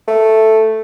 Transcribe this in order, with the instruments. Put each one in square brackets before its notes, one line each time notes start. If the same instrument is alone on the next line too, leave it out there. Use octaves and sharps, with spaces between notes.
[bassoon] A3